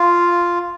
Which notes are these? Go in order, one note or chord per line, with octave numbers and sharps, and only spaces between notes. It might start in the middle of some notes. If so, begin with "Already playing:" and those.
Already playing: F4